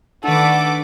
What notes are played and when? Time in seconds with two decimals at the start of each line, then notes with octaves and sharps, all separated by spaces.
0.24 D#3 A3 D4 A4 B4 F#5 D6